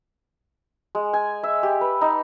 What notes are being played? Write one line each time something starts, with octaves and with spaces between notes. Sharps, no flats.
G#3
G#5
E5
G4
B4
D#4